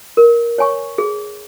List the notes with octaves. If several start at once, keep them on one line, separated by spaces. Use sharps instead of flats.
A#4
C#5 G#5 C#6
G#4